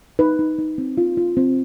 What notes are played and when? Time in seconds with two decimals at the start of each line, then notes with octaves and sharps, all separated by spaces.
0.19 D#4 B4
0.39 D#4
0.59 D#4
0.78 C4
0.97 F4
1.17 F4
1.37 C4